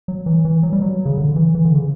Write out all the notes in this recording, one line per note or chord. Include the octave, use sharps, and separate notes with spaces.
F#3
E3
E3
F#3
G3
F#3
C#3
D3
E3
E3
D3
C#3